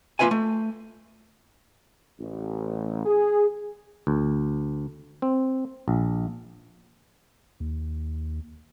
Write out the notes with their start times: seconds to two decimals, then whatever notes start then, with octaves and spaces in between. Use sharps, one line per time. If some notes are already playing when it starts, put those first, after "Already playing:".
0.19 A#3 F4 B4 E5 G#5
0.31 A3
2.20 A1
3.06 G#4
4.07 D2
5.22 C4
5.88 A#1
7.60 D#2